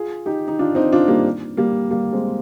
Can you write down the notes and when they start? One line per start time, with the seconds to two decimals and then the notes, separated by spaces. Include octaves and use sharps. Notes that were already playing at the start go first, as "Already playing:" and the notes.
Already playing: F4 G#4
0.26 D#4 G4
0.48 D#4
0.59 D4 F4
0.75 C4 D#4
0.92 D4 F4
1.08 G3 A#3
1.57 G3 A#3
1.91 G3 A#3
2.13 G#3 C4